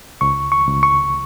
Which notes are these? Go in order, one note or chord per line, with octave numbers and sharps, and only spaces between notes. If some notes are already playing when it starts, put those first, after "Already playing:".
C#2 C#6
C#6
C#2
C#6